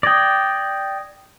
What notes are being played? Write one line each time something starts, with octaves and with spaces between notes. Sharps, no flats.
D5 G5 D#6 G#6 A#6